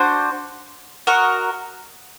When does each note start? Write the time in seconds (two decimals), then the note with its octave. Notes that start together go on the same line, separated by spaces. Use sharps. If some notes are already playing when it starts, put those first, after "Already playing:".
Already playing: D4 F#4 C5
1.07 F#4 A#4 D#5 F#5